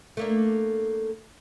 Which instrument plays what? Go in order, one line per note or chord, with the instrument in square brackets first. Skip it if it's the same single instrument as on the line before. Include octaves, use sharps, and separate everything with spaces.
[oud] A3 A#3 D4